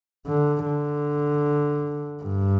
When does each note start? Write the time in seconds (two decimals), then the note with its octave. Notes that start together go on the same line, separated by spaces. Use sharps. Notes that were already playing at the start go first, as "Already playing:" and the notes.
0.27 D3
0.66 D3
2.23 G2